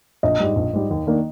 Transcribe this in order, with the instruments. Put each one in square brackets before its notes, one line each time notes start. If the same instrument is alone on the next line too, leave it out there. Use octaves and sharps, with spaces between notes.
[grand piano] A#1 [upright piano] D#5
[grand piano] G#2 G3
A#1
G#2 G3
D#2
D#3 A#3 D4